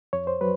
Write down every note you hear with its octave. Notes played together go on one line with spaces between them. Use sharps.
F2 C#5
C5
F#3 B4